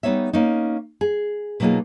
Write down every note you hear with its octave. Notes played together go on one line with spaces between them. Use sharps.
G3 B3 D#4 C#5 E5
A#3 C#4 D#4
G#4
B2 F#3 A#3 D#4 F4 G#4